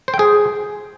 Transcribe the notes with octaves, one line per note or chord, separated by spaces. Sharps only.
C5
G5
G#4